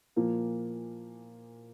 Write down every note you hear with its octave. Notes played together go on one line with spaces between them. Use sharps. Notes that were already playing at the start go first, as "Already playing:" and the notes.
A#2 F3 A#3